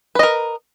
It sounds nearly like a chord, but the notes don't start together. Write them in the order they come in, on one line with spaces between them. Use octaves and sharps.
B4 D#5 A#4